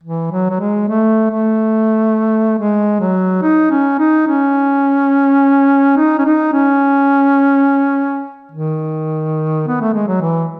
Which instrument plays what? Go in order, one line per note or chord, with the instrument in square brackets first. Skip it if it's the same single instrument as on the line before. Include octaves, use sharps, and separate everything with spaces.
[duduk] E3
F#3
F#3
G#3
A3
A3
G#3
F#3
D#4
C#4
D#4
C#4
D#4
C#4
D#4
C#4
D#3
B3
A3
G#3
F#3
E3